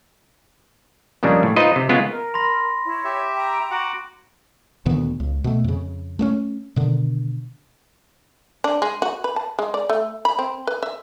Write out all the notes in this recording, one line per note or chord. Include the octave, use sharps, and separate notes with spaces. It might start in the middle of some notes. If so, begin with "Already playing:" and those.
F2 A#2 C#3 G3 G#3 D4
A2
D#4 F4 B4 C5 D#5
C3
C#3 G#3 B3 F4
A#4
B5 C6 A#6
E4 C#5
G4 E5
G5 A#5
F#4 F#5 D6
D2 A#2 D#3 B3
C#2
B2 A3
F2 C#3
A3 A#3 C#4
B2 D3 D#3
D4
G#3
F#4
B4
A5
G#3
D5
A3
B5
C4
B4
E5